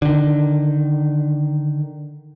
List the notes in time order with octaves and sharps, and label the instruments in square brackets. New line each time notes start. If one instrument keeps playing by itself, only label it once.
[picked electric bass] D3 D#3